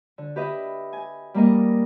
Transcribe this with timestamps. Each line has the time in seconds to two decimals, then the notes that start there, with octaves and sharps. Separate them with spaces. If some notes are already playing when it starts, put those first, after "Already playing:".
0.18 D3
0.36 G4 B4 D#5 E5
0.93 G#5
1.34 G3 A#3 A#4 D#5